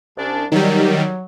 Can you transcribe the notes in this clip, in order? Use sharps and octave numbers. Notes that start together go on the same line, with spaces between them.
C2 C#4 D4
D#3 F#3 G3